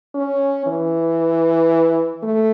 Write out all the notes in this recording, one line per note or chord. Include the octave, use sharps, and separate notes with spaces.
C#4
E3
A3